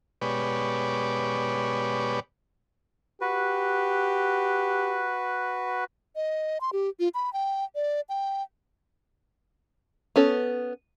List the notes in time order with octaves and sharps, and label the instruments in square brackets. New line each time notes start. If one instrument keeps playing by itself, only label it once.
[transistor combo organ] B2 G#3 G4 B4 C#5 D5
[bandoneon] F#4 B4 [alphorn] G4
[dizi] D#5
C6
G4
F4
B5
G5
D5
G5
[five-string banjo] B3 C#4 A4